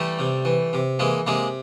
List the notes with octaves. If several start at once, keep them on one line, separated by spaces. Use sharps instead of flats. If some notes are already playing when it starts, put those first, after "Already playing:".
Already playing: E3 G3 A3
C3
E3
C3
E3 G#3 A#3
C3 G#3 A#3